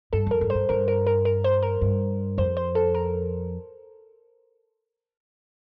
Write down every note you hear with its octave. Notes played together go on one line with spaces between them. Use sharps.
G2 A4
F2 A#4
G2
C5
G2
G2 A#4
A#4
A#4
A#4
C5
A#4
G2
F2 C5
C5
A4
A#4